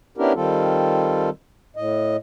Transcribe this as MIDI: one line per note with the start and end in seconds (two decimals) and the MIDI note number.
0.18 0.33 59
0.18 0.33 61
0.18 0.33 62
0.18 0.33 64
0.18 0.33 67
0.18 0.33 70
0.35 1.30 51
0.35 1.30 55
0.35 1.30 60
0.35 1.30 65
0.35 1.30 69
1.76 2.17 45
1.76 2.17 75